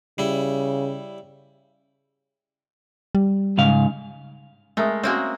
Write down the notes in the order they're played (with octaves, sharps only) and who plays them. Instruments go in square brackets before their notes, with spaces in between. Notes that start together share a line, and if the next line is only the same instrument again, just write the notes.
[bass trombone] C#3 [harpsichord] G3 E4
[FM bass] G3
[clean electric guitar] G#2 C#3 F5
[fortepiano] G#3 A#4 D#6 [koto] A3
[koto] G#3 A#3 C4 [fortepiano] C#4 F#4